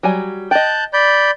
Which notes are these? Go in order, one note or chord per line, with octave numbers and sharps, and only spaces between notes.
F#3 G3 G#5
D#5 G5 A5 F#6 G6
D5 B5 G6